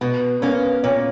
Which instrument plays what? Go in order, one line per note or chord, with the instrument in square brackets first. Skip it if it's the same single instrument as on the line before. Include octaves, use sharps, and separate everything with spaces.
[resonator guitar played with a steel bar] B2 [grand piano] B3
[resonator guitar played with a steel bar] A#3 C#4 [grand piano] B3
[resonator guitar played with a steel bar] A#2 [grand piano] C#4